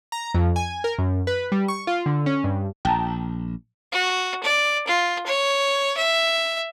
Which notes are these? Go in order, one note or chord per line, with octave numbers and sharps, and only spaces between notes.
A#5
F2
G#5
A#4
F#2
B4
G3
C#6
F4
D3
C#4
G2
A#1 G5 A5 A#5
F#4
D5
F4
C#5
E5